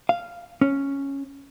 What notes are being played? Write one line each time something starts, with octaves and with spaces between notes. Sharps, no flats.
F5
C#4